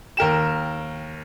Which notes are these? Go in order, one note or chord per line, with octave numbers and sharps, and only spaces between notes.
D#2 A#4 G5 E7